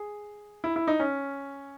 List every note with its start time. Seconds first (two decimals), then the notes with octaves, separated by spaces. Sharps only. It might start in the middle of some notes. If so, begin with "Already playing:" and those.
Already playing: G#4
0.64 E4
0.76 E4
0.87 D#4
1.00 C#4